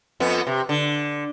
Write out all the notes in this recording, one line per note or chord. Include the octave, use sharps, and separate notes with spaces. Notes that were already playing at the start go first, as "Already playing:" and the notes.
F2 B3
C3
D3